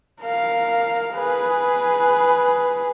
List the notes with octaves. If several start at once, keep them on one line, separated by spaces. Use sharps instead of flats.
A#4 F5
G#4 B4